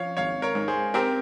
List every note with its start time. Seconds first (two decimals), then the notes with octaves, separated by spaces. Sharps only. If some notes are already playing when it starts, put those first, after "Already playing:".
Already playing: F3 C#5 F5
0.17 G#1 C#5 F5
0.42 A#4 C#5
0.55 G#2
0.68 G#4 C5
0.94 C4 G4 A#4